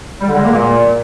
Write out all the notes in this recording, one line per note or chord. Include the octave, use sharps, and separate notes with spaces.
G3
D3
G#3
A#3
A#2